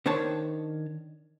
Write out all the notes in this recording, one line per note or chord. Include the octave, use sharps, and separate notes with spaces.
D#3 D4 C5 C#5 A5